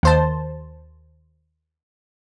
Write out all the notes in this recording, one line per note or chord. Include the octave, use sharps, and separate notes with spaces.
D#2 C5 A5